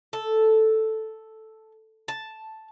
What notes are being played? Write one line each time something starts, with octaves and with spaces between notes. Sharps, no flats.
A4
A5